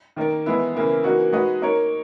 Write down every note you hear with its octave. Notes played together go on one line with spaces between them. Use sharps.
D#3 A#3 D#4 A#4
E3 G#3 B3 E4
C#3 E3 A#3 E4
E3 A#3 D#4 F#4
G#3 D#4 F#4 B4 D#5
A#3 D#4 A#4 C#5